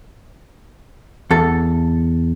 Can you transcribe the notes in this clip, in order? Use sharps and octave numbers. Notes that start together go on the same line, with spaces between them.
E2 A4